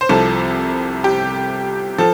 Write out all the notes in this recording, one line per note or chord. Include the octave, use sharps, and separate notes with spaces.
C5
C2 C3 F3 A4
G4
F3 A4